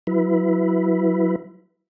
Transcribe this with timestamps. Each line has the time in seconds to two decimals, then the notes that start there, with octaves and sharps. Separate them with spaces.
0.07 F#3 E4 B4